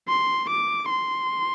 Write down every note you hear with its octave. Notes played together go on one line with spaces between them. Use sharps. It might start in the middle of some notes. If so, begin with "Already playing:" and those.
C6
D6
C6